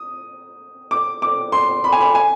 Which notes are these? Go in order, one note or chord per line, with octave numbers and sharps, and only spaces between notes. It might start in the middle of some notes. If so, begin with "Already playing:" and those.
Already playing: D#6
D6
D6
C6
B5
G#5
B5
G#5